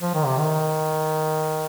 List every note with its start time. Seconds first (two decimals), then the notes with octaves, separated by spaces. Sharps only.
0.01 F3
0.14 D#3
0.26 C3
0.38 D#3